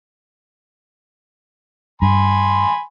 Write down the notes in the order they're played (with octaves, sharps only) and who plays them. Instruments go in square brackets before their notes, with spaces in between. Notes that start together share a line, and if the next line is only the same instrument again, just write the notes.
[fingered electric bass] G2 [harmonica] G#5 B5 C6